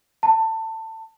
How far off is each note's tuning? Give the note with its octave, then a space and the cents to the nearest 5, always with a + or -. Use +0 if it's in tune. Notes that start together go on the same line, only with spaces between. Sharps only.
A5 +25